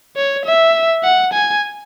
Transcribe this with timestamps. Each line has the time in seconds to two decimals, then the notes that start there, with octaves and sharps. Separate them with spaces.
0.16 C#5
0.46 E5
1.04 F#5
1.34 G#5